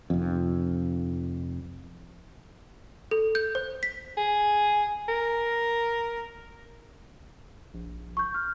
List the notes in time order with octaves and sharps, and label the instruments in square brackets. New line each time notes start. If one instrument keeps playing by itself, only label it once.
[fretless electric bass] F1 F2
[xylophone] A4
G6
C5
B6
[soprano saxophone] G#4
A#4
[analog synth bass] A#1
[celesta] C#6 G6
F6